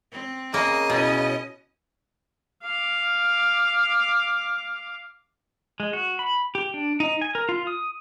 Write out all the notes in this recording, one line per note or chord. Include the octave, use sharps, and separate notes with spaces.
C4
C#3 A#3 D#5
B2 C#4 E4
F5 D6
G#3
F#4
B5
G4
D4
D#4
G#5
A#4
F4
D#6